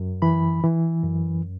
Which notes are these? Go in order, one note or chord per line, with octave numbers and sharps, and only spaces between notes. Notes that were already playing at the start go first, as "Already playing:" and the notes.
Already playing: F#2
E3 B5
E3
F#2